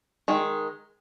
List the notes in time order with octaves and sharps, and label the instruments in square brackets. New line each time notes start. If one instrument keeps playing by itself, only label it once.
[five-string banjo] D#3 G#3